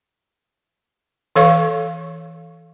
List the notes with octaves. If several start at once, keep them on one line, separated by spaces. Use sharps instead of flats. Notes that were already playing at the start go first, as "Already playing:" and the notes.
E3 A4 C#5 F5 C#6